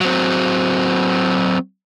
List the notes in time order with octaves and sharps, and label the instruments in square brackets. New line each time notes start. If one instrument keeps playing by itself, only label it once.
[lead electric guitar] F#3 C4